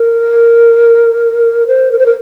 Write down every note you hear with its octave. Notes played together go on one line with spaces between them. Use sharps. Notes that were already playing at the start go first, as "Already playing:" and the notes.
Already playing: A#4
C5
A#4
C5
A#4